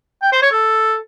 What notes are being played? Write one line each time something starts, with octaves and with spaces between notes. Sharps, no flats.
G5
C5
C#5
A4